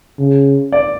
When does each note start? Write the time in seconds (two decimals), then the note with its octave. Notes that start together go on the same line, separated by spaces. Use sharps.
0.19 C#3
0.72 D5